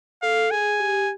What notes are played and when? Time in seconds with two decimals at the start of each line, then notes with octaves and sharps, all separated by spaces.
0.23 A4 F5
0.51 G#4 G#5
0.80 G4